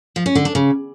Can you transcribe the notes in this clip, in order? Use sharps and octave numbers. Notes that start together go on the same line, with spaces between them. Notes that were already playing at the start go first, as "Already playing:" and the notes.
F3
C#4
D3
D4
C#3